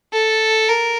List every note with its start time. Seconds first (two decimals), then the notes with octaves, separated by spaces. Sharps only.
0.13 A4
0.69 A#4